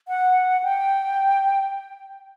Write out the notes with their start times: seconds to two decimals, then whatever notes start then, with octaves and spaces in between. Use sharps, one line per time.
0.08 F#5
0.64 G5